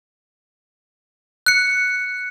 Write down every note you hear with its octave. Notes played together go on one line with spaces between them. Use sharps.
F#6 C#7